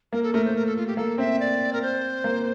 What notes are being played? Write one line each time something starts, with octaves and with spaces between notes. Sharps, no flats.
A#3 A#4
A4
A3 A#4
C5
A#4
A4
F4
G4
A#3 A4
C4 E5
D5
A#4
C5
A#3